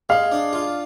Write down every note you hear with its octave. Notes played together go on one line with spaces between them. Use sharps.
G#3 F5
D4
F4